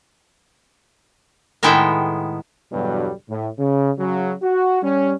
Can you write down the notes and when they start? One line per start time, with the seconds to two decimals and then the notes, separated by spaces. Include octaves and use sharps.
1.63 A2 D#3 G#3 B3 E4 G5
2.72 E2 G2 B2 D3 F#3 G3
3.29 A2
3.58 C#3
3.98 C#3 F#3
4.42 F#4
4.82 G3 C#4